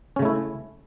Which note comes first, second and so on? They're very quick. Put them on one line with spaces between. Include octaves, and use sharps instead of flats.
C#4 C#3 A3 E4